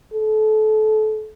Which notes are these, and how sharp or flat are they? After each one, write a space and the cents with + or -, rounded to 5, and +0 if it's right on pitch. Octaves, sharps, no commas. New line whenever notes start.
A4 -30